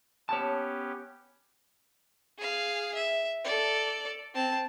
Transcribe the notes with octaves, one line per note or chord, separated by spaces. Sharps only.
B3 C#4 G4 C#5 A5
G#4 F5
E5
A4 D5
C4 A5